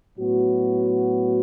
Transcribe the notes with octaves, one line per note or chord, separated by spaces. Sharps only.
A2 F#3 B3 F#4